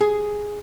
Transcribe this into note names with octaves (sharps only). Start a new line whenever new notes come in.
G#4